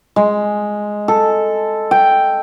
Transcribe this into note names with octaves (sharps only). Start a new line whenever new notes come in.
G#3
A4
G5